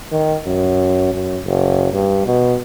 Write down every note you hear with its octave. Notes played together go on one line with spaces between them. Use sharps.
D#3
F#2
F#2
F#1
G2
B2